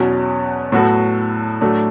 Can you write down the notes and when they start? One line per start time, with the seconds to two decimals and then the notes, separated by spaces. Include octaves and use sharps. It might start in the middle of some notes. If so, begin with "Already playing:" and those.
Already playing: E2 B2 F#3 C#4
0.72 A2 F#3 B3 F#4 A4
1.61 A2 F#3 A3 D4